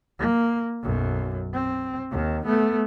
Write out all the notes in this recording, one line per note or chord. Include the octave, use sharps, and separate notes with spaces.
A#3
B1 F#2
C4
D#2 D#3
A3 B3